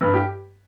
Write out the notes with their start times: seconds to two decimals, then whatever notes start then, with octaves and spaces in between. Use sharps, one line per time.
0.01 G2 B4
0.14 G4